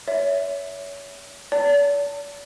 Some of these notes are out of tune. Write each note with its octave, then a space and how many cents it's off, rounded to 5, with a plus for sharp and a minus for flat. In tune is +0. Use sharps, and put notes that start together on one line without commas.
C#5 +25 E5 +0
D5 -45 A5 +30